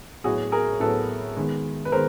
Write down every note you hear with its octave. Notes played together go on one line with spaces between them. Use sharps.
A2 F#3 B3 F#4 G#4
G#4 A#4
A2 F#3 B3 A4 B4
D#3 G#3 B3
B4
D#3 G#3 B3 A#4 C5